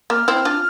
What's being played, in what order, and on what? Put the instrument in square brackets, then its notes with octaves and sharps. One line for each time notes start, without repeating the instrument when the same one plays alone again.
[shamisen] A#3 [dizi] F6
[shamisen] C4 E4
D4 F4